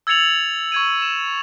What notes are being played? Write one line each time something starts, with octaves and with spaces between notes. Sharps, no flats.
E6 G#6 A6 C#7 F7 F#7
C#6 G#6 D#7
E7